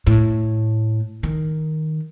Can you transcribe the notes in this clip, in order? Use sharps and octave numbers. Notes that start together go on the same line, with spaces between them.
A2
D#3